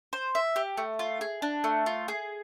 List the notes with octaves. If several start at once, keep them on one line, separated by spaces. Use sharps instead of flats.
C5
E5
G4
A3
F4
G#4
D4
A3
F4
G#4